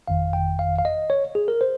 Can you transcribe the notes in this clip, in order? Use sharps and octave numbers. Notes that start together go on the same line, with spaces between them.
G1 F2 D#3 F5
G5
F5
F5
D#5
C#5
G#4
A#4
C5